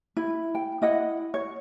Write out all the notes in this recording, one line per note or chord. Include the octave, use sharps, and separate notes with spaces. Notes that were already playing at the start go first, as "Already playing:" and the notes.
E4
G5
E4 D#5 F#5
C#5